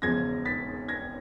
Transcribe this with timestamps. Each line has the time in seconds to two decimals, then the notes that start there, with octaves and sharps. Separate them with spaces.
0.02 E1 E2 C#3 F3 G#6 A#6
0.45 A6 B6
0.88 G#6 A#6